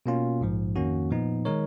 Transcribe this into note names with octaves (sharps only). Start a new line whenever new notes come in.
B2 A#3 C#4 F4
A#1 G#2 F3
F2 D#3 A#3 C#4 F#4
A#2 F3 B3 D#4
D#3 G#3 D#4 A#4 C#5